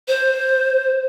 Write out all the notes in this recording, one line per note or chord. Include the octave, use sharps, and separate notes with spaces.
C5